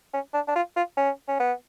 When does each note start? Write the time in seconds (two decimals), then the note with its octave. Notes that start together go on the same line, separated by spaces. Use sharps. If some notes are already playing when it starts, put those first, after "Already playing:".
0.13 C#4
0.34 D4
0.48 D4
0.55 F4
0.76 F4
0.97 C#4
1.28 C#4
1.40 B3